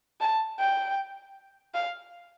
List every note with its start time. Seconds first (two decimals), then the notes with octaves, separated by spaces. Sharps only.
0.21 A5
0.59 G5
1.74 F5